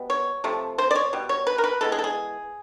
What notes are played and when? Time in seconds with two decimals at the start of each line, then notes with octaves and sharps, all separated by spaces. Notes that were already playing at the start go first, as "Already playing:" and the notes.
Already playing: B2 G3 B3
0.10 C#5
0.44 C3 F3 A3
0.78 C5
0.91 D5
0.95 C#5
1.13 B2 G3
1.29 C#5
1.47 B4
1.58 A#4
1.64 B4
1.81 E3 G#3 B3 A4
1.92 G#4
1.99 A4
2.04 G#4